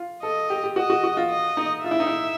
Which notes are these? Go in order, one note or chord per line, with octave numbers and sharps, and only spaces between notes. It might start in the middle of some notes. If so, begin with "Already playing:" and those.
Already playing: F4
A4 D#5
G4
G4
F#4 D#5
F#4
F#4
F4
D#5
D#4
F4 E5
E4
D#4
E4